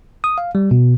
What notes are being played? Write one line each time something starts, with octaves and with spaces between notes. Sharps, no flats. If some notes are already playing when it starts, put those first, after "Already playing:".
D#6
F5
G3
B2